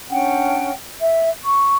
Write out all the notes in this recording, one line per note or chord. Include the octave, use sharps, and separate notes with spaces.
C#4 D4 F#5 G5
E5
C#6